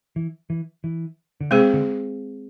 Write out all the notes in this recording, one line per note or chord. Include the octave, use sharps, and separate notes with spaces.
E3
E3
E3
D3
C3 G#3 C4 G#4 C5
D3